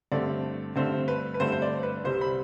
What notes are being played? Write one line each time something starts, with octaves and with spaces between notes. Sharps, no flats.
G2 D3 A3 C4 D5
G2 D3 A3 C4 C5
B4
B4
G2 D3 A3 C4 C5
C5
D5
B4
C2 C3 G3 C5
B5